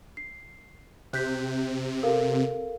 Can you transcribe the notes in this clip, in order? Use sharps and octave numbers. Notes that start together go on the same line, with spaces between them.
C7
C3 F#6 G6 B6
A4 A#4 F5